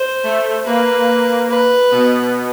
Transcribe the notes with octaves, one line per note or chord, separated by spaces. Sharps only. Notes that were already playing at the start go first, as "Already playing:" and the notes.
Already playing: C5
A3
A#3 B4
B4
B2 B3